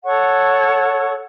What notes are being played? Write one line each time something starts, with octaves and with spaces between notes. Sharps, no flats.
A4 C#5 F#5 C#6